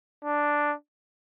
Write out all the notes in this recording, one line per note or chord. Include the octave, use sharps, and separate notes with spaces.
D4